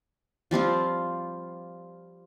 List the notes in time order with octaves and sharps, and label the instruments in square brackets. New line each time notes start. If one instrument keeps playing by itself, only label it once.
[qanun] F3 G3 C4 F4